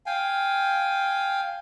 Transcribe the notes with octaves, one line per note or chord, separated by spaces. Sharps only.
F5 G5 G#5